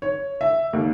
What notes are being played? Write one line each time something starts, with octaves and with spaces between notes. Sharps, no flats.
C#5
E5
D#2